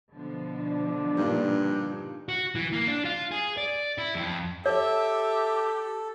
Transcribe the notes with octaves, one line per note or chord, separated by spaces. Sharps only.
B2 D3 F3
D4
G2 A#2 A#3 D#4
F#4
E3
A#3
D4
F4
G#4
D5
E4
F2
G4 A4 C#5 E5